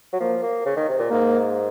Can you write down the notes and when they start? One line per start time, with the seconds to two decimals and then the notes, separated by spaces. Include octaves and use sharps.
0.13 F#3
0.20 F3 A#3
0.43 A#3
0.66 C#3
0.77 D#3
0.88 C3
0.99 A#2
1.10 G#2 A#3